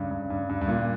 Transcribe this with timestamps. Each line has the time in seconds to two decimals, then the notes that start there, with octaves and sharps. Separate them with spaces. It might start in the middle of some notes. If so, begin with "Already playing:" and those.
Already playing: G2 C#3
0.11 G2
0.30 G2
0.49 G2
0.61 G2
0.68 A#2